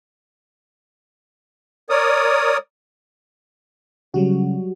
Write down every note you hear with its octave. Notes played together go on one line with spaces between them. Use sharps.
A#4 C#5 D5 D#6
C#3 F#3 G3 F#4